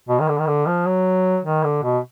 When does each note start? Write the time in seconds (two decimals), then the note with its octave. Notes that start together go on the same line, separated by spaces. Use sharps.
0.09 B2
0.20 D#3
0.28 D3
0.38 D#3
0.47 D3
0.66 F3
0.86 F#3
1.44 D#3
1.63 D3
1.83 B2